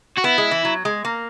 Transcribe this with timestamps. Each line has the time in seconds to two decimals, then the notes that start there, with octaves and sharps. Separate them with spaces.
0.17 F#4
0.24 B3 E4
0.38 G#3
0.51 E3
0.65 F#3
0.85 G#3
1.05 A#3